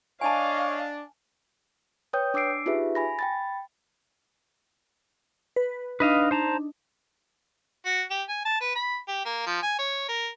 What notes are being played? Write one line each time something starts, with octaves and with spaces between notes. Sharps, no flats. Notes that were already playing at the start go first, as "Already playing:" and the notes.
D4 C#5 D#5 F5 G#5 A5
B4 C#5 G5 D#6 G6
D4 D6 E6 C7 D7
D#4 F4 G4 G#4 B4 E5
G#5 B5 A#6
G5 B5 A6
B4
D4 D#4 B4 D#5 F5
C5 A5 A#5
F#4
G4
G#5
A5
B4
B5
G4
A#3
F3
G#5
C#5
A#4